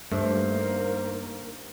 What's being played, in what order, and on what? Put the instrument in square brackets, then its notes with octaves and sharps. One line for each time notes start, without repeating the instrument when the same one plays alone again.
[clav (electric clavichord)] G2 [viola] D#3 A#3 [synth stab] A3 D4 [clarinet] C5